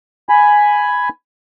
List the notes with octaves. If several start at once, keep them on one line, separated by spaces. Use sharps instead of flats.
G#5 B5